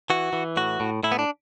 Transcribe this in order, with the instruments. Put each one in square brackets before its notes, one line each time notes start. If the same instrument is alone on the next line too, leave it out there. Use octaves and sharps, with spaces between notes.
[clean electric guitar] E3 F#4
E3
A2 F#4
A2
A2 E4
B3
D4